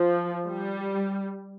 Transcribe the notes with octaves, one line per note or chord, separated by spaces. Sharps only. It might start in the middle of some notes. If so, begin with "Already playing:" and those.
Already playing: F3
G3